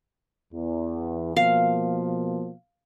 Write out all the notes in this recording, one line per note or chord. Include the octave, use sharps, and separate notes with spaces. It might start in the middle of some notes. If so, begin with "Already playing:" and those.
E2
B2 F3 A#3 F5